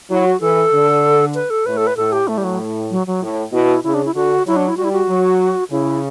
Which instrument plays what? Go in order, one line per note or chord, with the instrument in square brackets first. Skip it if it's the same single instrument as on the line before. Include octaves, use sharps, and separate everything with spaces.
[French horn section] F#3 [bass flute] E4
[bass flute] F#4
[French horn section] E3 [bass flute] A4
[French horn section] D3
[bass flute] B4
A4
[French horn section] A2 [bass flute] B4
[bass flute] A4
B4
[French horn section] A2 [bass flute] A4
[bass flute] G4
[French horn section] A2 [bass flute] A3
[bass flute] G3
F#3
F#3
F#3
[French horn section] A2
[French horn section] B2 [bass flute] E4
[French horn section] C#3 [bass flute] E4
[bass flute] D4
E4
[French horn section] D3 [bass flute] F#4
[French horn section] F#3 [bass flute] E4
[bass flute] D4
E4
[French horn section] G3 [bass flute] F#4
[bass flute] E4
F#4
[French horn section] F#3
[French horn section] C#3 [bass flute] E4